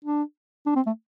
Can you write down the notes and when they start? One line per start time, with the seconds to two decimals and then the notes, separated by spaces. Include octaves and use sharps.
0.05 D4
0.66 D4
0.76 C4
0.86 A3